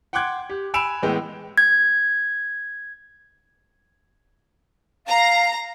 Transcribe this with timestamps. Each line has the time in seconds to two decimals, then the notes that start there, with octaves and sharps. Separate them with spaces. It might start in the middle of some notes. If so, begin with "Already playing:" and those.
0.13 F#5 G5 C6 D6 F#6 G#6
0.50 G4
0.74 G#5 B5 E6 D7 E7 F7
1.02 A2 E3 G#3 B3 G5
1.58 G#6
5.07 F5 A#5